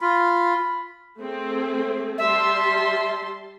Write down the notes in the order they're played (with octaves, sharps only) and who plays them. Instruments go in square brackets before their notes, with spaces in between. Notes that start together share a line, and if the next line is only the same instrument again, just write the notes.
[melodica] F4 [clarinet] B5
[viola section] A3 C4 G#4
[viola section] G3 A5 C6 [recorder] E5